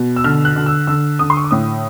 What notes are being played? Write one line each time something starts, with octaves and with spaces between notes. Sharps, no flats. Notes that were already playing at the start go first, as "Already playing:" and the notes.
Already playing: B2
E6
D3 F6
F#6
D3
E6
D3 E6
D3 D#6
C6
C#6
D6
A2 D#6